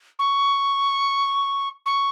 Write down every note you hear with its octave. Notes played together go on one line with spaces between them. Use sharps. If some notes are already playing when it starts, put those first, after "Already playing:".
C#6
C#6